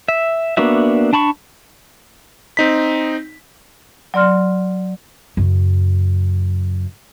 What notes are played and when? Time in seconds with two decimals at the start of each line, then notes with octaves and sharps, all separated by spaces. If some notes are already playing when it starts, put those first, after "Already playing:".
0.08 E5
0.57 A#3 B3 D4 F#4 E5
1.13 D4 A5 B5 C#6
2.57 C4 D#4 B6
4.14 F#3 D5 C6 F6
5.37 F#2 C#3